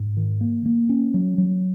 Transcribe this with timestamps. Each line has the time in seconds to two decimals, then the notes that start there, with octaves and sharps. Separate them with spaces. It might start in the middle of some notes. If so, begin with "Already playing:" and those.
Already playing: G#2
0.17 D#3
0.41 A#3
0.66 A#3
0.89 C#4
1.14 F#3
1.38 F#3